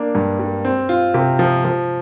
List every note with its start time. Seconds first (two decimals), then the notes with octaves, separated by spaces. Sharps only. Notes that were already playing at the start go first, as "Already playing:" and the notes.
Already playing: A#3 D4
0.15 G2
0.39 G3
0.65 C4
0.89 F4
1.14 C3
1.39 F3
1.65 F3